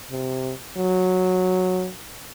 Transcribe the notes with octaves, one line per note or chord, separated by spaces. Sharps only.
C3
F#3